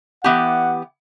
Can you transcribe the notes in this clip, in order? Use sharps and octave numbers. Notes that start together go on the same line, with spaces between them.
E3 B3 G4 F#5